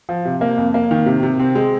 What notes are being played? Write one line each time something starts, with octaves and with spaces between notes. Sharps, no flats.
F3
C3
A#3
F2
A#3
D#3
C3
C3
C4
G#3